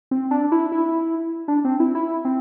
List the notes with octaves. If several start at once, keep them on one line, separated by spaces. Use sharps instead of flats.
C4
D4
E4
E4
D4
C4
E4
E4
C4